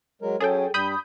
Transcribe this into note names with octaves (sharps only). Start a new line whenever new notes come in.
F#3 G#3 A#4
F#3 C#4 G#4 A4 G5
G2 G3 B5 D#6 G6